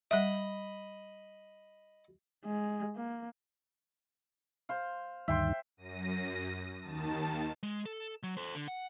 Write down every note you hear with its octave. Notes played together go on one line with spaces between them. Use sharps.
G3 D#5 E5 B5
G#3
A#3
C5 F5
D2 G2 D#3 E5 G5 C6
F#2 A#6 D#7
D#2 D#3 A5
G#3
A4
F#3
A4 C5
D3
F#5